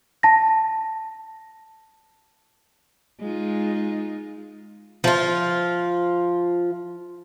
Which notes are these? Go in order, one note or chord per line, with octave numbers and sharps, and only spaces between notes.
A5 A#6
G#3 D#4 F4
F3 F4